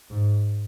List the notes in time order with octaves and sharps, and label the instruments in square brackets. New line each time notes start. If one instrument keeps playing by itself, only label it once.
[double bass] G#2